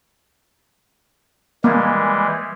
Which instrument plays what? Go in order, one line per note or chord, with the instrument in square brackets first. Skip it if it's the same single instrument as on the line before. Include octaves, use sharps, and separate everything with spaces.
[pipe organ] E3 G3 G#3 [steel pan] A#3